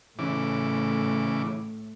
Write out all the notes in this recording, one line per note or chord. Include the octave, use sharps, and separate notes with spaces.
A2 C#3 E3 D6